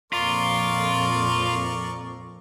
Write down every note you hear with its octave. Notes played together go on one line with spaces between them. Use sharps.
F2 A#2 F4 A#4 D5 C#6